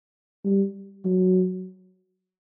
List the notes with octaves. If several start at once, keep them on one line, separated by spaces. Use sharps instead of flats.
G3
F#3